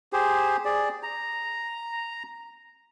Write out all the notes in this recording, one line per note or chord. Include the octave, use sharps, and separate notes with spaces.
G4 G#4 C5
G#4 D5
A#5